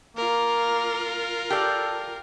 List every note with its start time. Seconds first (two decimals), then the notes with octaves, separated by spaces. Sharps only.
0.17 A#3 F4 A#4
1.50 G4 A4 D5